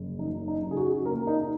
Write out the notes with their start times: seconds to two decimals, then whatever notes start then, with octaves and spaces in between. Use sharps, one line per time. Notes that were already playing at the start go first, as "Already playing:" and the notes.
Already playing: F#1
0.19 F#2 D#4
0.48 D#4
0.62 C#3
0.71 G#4
0.77 F#4
1.05 A#3 A#4
1.27 D#4